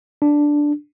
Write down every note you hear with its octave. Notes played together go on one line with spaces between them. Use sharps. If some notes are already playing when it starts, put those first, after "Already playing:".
D4